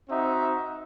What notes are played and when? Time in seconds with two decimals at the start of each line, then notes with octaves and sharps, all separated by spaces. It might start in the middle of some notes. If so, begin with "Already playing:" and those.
0.09 C4 D#4 F#4 E5